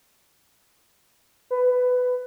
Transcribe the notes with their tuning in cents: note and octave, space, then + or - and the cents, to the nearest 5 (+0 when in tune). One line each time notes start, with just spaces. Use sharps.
B4 +15